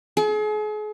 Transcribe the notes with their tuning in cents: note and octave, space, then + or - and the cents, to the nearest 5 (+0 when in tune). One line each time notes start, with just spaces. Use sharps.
G#4 +40